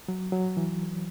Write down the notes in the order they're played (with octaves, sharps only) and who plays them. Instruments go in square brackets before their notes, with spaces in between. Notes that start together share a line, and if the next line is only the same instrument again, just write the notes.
[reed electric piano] F#3
F#3
E3